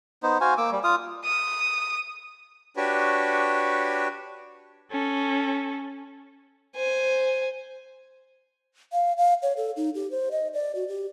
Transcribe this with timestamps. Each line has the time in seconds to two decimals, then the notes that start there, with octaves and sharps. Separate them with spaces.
0.23 B3 D#4 C5
0.41 F#4 C5 F5 G#5
0.58 A#3 D6 E6
0.71 G3
0.84 F4 F5 D#6
1.24 D#6
2.77 D4 F#4 G4 B4 C#5
4.91 C#4 A4
6.75 C5 G#5
8.93 F5
9.17 F5
9.42 C#5
9.57 A4
9.76 D#4
9.95 G4
10.11 C5
10.31 D#5
10.53 D5
10.75 F#4
10.88 G4